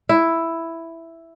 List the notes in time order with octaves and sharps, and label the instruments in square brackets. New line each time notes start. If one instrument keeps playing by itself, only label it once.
[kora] E4